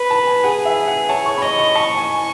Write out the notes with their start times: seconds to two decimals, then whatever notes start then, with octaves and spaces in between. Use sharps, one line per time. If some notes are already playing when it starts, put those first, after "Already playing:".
Already playing: B4
0.10 A5
0.27 G#5
0.44 G#4 F#5
0.65 E5
0.87 F#5
1.09 C#5 A5
1.26 C#6
1.38 B5
1.42 D#5 C#6
1.59 C#6
1.75 A5 C#6
1.97 G#5